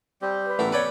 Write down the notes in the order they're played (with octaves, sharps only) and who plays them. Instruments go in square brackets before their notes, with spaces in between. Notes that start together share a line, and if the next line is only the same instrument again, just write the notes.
[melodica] G3 C4 G4
[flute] B4
[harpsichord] A1 A3 A#4 [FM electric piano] B3
[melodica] A4 [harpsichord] B4 D5 G5 [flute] C#5